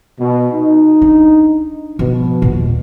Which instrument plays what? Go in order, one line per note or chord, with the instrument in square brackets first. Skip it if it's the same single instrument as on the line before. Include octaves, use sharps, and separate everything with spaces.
[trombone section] B2
D#4
[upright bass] D4
[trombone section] B2 [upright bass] F3
[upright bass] D#2 A#2